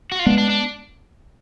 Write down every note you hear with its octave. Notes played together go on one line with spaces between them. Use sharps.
F#4
F4
G#3 B3 D4
D4
D4